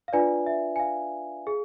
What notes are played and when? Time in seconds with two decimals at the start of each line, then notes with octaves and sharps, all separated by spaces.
0.08 F5
0.13 D4 F4 B4 D5 G#5
0.46 E5
0.76 G#5
0.79 F5
1.47 G#4